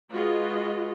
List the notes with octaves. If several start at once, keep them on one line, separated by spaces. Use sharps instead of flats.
G#3 F4 F#4 G#4 B4 D#5